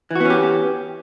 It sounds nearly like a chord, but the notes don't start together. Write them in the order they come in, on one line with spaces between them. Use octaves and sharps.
E3 F#4 B3 C#4 G4